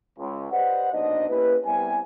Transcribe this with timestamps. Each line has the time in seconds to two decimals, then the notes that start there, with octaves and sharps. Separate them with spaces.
0.19 C#2
0.51 G4 B4 C5 D5 D#5 F#5
0.93 A#1 B2 D4 D#4 C5 D#5
1.29 A#3 C#4 E4 G4 B4
1.65 C2 C3 G3 B3 E4 G#5